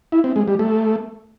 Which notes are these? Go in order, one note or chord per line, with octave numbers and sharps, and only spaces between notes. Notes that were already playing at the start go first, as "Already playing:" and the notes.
E4
C4
G#3
G3
A3